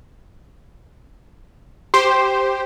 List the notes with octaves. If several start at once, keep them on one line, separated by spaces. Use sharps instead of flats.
G4 C5 C6